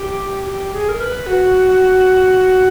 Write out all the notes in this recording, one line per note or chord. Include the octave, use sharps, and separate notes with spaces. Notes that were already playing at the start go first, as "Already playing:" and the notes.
Already playing: G4
G4
G#4
A#4
B4
F#4